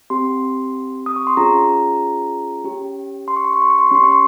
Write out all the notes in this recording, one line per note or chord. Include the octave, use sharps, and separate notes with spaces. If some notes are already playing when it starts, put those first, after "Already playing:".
C4 G4 C6
D#6
C#6
C6
C#4 F4 G#4 A#5
C#4 G4
C6
C#6
C6
C#6
C6
C#6
C6
C#6
C#4 G4 C6
C#6
C6